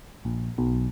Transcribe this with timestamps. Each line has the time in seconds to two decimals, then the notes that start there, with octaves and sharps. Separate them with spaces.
0.25 A#1
0.58 B1